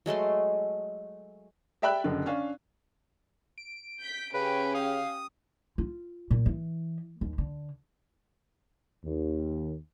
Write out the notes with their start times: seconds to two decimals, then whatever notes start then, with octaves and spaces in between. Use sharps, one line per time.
0.06 F#3 G#3 A3 C6
1.82 G4 D5 E5 G5 B5 F#6
2.04 F#1 F#2 D3
2.26 C#4 D4 F5
3.58 D7
4.00 G6 B6
4.34 C#3 C#4 G4 B4
4.75 F5 D#6
5.78 F4
6.31 A#2
6.46 E3
7.21 D#2
7.38 D3
9.04 D#2